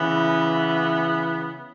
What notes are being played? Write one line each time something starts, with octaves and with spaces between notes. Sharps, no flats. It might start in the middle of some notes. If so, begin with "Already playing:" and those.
Already playing: C#3 E3 B3